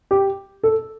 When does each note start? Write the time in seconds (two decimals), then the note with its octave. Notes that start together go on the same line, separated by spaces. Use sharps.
0.11 G4
0.63 A4